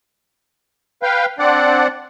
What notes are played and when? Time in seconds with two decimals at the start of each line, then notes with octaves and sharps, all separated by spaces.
1.03 B4 F5 G5
1.39 C4 D4 D5 F#5